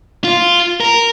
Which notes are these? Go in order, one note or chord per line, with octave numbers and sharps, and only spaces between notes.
F4
A#4